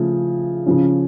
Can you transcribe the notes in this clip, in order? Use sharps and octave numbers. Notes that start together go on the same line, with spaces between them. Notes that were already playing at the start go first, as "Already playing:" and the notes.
Already playing: C#3 F3 A3
C#3 F3 C#4